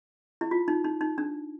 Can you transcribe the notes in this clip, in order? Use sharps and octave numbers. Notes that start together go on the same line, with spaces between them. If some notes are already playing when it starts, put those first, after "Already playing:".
E4
F4
D#4
D#4
D#4
D4